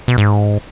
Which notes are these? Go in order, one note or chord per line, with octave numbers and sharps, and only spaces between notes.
B2
G#2